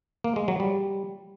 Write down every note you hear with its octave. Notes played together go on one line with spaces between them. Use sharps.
A#3
G#3
F#3
G3